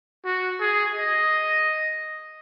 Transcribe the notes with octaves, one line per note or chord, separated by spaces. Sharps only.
F#4
G#4
D#5